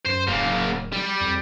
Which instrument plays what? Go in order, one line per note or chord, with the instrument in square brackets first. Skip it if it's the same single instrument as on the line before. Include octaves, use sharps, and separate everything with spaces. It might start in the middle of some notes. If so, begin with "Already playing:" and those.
[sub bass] F#2 [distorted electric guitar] C5
[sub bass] D1 [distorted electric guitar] C#3 A#3
[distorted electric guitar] G3
[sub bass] F2